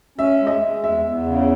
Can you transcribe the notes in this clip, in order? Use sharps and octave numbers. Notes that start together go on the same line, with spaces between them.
C#4 E5
G#3
D#5
E5
G#3
E2 E5
E2
C#3